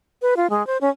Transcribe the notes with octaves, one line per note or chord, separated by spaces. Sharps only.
B4
F4
G#3
C5
C#4